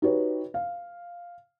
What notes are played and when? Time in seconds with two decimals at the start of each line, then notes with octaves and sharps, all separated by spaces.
0.02 D#4 F#4 G4 B4 C#5
0.54 F5